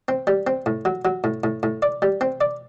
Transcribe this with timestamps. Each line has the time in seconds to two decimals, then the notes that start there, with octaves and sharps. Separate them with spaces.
0.08 C4
0.27 G3
0.47 C4
0.66 A2
0.85 F#3
1.05 F#3
1.24 A2
1.44 A2
1.63 A2
1.82 D5
2.02 G3
2.21 C4
2.41 D5